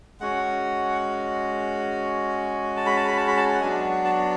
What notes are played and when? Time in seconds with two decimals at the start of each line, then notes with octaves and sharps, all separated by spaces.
0.20 G#3 C#4 F#4 F#5
2.76 A5
2.86 B5
2.97 A5
3.07 B5
3.17 A5
3.27 B5
3.37 A5
3.55 F#5
3.62 F#3 B3 D4 F#4 G#5
4.05 A5